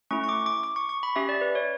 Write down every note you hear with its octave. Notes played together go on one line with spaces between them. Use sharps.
A3 C#4 E4 C#6
C#6
D6
D6
D6
C#6
C#6
B5
C#4 G4 E5
D5
B4
C#5